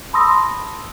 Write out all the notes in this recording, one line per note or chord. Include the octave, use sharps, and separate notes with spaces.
A5 B5 C6 D#6 E6 A#6